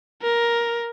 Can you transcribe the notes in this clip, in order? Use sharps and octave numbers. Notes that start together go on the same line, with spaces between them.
A#4